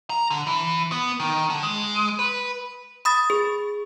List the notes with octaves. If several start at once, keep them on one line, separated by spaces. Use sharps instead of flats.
A#5
D3
E3
B3
D#3
D3
G#3
B4
B5 D#6 A6
G#4